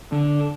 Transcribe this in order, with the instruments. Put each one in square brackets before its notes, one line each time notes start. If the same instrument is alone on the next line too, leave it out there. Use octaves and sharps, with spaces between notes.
[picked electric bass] D3